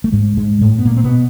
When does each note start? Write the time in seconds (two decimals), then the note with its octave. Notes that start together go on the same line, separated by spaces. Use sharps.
0.04 A3
0.12 G#2 G#3
0.37 G#2 G#3
0.61 A2 A3
0.78 B3
0.85 A#2 A#3
0.97 C4
1.04 B2 B3